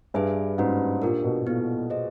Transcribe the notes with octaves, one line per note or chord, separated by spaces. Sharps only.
G2 G#4 B4 E5 G#5
G#2 A#3 C#4 F#4 B4
A#2 D4 G4 A#4
B2
A#2 B3 E4 A4
G#4 C5 D#5